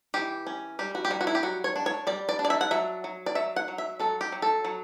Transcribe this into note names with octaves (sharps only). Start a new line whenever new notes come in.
E3 G4
C#4
G3 G4
F#4
G4
G3 F#4
F#4
E4
G4
F#3 F#4
C#5
D4
C#5
G3 D5
D5
D4
D5
E5
F#5
F#3 E5
F#3
D5
F#3 E5
F#5
F#3
E5
F#3 A4
G4
F#3
A4
F#3